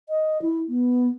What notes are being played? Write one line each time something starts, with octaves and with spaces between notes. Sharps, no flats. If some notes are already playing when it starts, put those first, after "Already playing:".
D#5
E4
B3